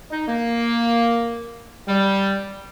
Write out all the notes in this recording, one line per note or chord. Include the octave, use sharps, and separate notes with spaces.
D#4
A#3
G3